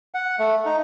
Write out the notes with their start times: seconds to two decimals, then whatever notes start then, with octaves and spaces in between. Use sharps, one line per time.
0.14 F#5
0.39 A3
0.65 D#4